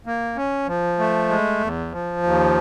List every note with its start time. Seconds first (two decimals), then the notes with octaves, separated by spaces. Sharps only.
0.06 A#3
0.36 C#4
0.67 F3
0.99 A3
1.29 G#3
1.60 E2
1.92 F3
2.23 D#2